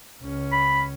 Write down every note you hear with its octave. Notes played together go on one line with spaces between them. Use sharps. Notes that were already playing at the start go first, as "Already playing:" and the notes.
C#2 C#4
B5